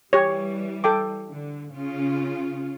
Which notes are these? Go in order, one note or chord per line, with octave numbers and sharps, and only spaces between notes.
E3 G3 G4 C#5
A4 G5 D6
D3
C#3 C#4 F4